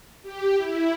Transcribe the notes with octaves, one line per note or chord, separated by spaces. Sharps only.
G4
E4